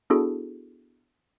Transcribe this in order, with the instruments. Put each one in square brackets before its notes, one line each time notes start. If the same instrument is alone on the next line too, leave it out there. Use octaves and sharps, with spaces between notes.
[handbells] B3 D4 E4 F#4 G#4 A4